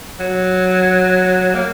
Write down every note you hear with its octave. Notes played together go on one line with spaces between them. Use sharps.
F#3
A#3